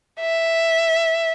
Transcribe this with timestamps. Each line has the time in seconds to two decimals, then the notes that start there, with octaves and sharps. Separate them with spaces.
0.20 E5